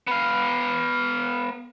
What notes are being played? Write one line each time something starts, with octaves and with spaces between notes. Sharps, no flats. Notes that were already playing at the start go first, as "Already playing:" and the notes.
B3 F5